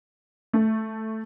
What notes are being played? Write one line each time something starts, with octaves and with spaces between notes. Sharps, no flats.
A3